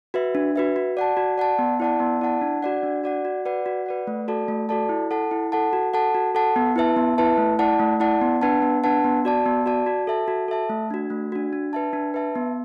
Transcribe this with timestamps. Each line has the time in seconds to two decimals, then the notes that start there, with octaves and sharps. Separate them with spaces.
0.14 F#4 B4 E5
0.35 D4
0.56 F#4 B4 E5
0.76 F#4
0.97 D5 F#5 A5
1.17 F#4
1.38 D5 F#5 A5
1.59 B3
1.80 E4 D5 F#5 A5
2.00 B3
2.21 E4 D5 F#5 A5
2.41 D4
2.62 F#4 D5 F#5
2.83 D4
3.04 F#4 D5 F#5
3.25 F#4
3.45 B4 D5 F#5
3.66 F#4
3.86 B4 D5 F#5
4.07 A3
4.28 F#4 A4 D5 A5
4.48 A3
4.69 F#4 A4 D5 A5
4.89 E4
5.11 A4 F#5 A5
5.31 E4
5.52 A4 F#5 A5
5.73 F#4
5.94 A4 F#5 A5
6.15 F#4
6.35 A4 F#5 A5
6.56 B3
6.76 E4 B4 E5 A5
6.96 B3
7.18 E4 B4 E5 A5
7.38 A3
7.59 E4 D5 F#5 A5
7.80 A3
8.00 E4 D5 F#5 A5
8.21 B3
8.41 D4 B4 F#5 A5
8.62 B3
8.84 D4 B4 F#5 A5
9.04 B3
9.25 F#4 D5 A5
9.46 B3
9.66 F#4 D5 A5
9.86 F#4
10.07 A4 E5 A5
10.28 F#4
10.48 A4 E5 A5
10.70 A3
10.91 D4 F#4
11.10 A3
11.32 D4 F#4
11.53 D4
11.73 B4 E5 A5
11.93 D4
12.14 B4 E5 A5
12.35 B3